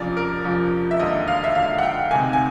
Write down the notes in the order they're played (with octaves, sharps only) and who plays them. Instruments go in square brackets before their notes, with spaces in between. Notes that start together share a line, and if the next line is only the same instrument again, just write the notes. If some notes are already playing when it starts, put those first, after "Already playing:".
Already playing: [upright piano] F1 F2 C#3 F3 D5
A#4
F1 F2 C#3 F3
E5
E1 D#2 D3 D#5
F5
E5
E1 D#2 D3 F5
F#5
G5
D2 C3 D#3 G#5
G#5